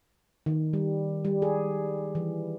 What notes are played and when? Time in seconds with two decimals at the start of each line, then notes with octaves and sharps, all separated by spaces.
0.46 D#3
0.73 G3
1.25 G3
1.42 G#4
2.15 E3